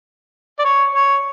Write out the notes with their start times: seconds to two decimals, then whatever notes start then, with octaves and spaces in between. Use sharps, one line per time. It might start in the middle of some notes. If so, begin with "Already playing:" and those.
0.59 D5
0.65 C#5
0.95 C#5